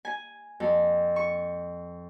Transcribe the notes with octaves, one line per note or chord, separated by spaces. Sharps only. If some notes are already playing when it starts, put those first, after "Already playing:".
G#5
F2
C#6